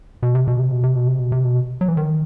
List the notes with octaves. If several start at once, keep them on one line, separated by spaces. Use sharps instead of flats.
B2
C3
B2
C3
B2
C3
B2
C3
B2
C3
B2
F#3
E3
D#3